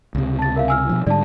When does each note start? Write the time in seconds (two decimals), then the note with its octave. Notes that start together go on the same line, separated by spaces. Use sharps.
0.15 C#2 C3
0.39 A5 A6
0.56 A#4 E5 F5
0.68 G#5 E6 F6
0.89 B2 F3
1.07 G#2 D3 G3 D5 A5